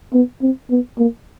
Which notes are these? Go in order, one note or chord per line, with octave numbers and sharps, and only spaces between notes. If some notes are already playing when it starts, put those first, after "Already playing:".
B3
C4
B3
A#3